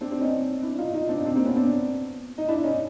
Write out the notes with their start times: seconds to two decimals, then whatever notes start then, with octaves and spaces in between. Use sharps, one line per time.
0.01 C4 D4
0.11 C4 D4
0.21 C#4 D#4
0.62 D4 E4
0.78 D#4 F4
0.93 D#4 F4
1.09 C4 D4
1.16 D#4
1.24 C4 D4
1.35 A#3 C4
1.45 B3 C#4
1.55 C4 D4
2.38 D#4
2.48 D4 E4
2.64 C#4 D#4